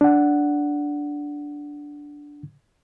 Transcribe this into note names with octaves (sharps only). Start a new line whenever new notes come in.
D4 F#5